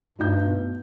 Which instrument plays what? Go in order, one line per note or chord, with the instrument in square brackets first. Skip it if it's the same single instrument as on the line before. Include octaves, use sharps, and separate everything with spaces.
[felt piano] D2 D#4 G6 [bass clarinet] G2
[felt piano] B2